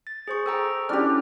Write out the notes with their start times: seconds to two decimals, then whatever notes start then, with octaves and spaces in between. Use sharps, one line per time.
0.07 A6
0.28 G#4 C5 C#6
0.46 A4 G5 A#5
0.89 C#4 D4 E4 G4 F6